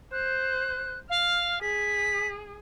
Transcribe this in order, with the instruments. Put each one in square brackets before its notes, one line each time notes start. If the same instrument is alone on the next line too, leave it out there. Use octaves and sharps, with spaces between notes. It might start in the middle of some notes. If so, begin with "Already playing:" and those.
[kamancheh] C5 [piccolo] F#6
[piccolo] F5 [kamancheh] F6
[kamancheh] G#4 [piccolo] B6